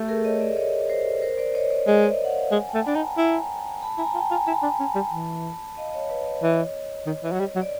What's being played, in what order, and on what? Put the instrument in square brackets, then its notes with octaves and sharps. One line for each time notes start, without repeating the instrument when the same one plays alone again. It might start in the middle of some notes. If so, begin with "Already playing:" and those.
Already playing: [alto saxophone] A3 [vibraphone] G4 A4
[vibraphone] G#4 A#4
C#5 D#5
D5 E5
C#5 D#5
A#4 C5
A#4 C5
C5 D5
C#5 D#5
C5 D5
[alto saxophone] G#3 [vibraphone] C#5 D#5
[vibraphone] D#5
D5 E5
F#5
D#5 F5
[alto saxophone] G#3 [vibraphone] F#5 G#5
[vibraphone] G5 A5
[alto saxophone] A3
[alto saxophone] D4 [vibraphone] A5 B5
[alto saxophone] D#4
[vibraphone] G#5 A#5
[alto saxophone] E4 [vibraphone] G#5 A#5
[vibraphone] A5 B5
[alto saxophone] E4 [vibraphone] G#5 A#5
[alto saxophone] F4 [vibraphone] G5 A5
[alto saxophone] F4 [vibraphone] G#5 A#5
[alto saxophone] E4 [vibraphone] A5 B5
[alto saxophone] D4
C#4
G3
E3
[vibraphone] D#5 F5
C#5 D#5
B4 C#5
C#5 D#5
[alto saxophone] E3
D#3
E3
F#3
G3
F#3
[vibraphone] D5